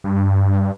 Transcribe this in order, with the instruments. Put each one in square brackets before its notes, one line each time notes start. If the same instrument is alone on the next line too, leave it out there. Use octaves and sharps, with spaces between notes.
[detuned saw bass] G2